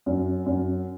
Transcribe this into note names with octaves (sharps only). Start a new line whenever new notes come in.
F#2
F#2